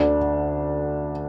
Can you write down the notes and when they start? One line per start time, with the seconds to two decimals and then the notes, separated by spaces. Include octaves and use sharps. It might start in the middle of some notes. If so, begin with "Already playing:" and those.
Already playing: D2 D3 D4